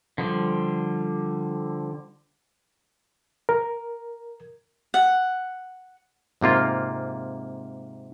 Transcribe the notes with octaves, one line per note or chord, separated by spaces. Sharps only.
D3 F3 G3
A#4
F#5
G#2 C3 A#3 F4